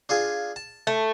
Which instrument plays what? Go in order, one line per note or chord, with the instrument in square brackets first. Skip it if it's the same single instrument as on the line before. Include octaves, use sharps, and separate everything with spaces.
[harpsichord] D4 F4 G#4
A5
[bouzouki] A3